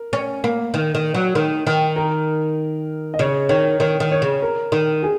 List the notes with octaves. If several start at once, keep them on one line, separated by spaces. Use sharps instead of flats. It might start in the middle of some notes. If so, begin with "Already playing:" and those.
Already playing: A#4
C#4
A#3
D#3
D#3
F#3
D#3
D#3
A#4
D#5
C#3 C#5
D#3 C#5
D#3 C#5
D#3
C#5
C#3
A#4
D#3
G#4